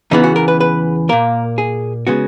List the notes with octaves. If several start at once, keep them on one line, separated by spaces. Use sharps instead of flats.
E2 C#3 E3 B3 D#4
F#4
A#4
B4
B4
A#2 A#3 A#4
G#4
C#3 G#3 B3 F#4